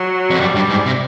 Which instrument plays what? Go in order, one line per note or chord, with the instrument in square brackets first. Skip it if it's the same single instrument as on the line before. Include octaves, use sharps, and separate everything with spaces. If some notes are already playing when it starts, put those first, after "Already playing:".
Already playing: [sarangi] F#3
[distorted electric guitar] F2
[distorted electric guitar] F#2 [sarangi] G3
[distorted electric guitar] G2
G#2
C3